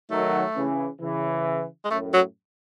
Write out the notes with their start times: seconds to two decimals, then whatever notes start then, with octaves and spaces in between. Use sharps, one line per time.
0.11 D#3 F#3 A3
0.56 C#3 E3
1.01 C#3 E3
1.84 G#3
1.91 F#2 A2 A3
2.14 F#3